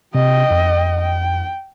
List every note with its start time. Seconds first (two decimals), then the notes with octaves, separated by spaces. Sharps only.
0.15 C3 D#5 G5
0.51 F2
1.01 G5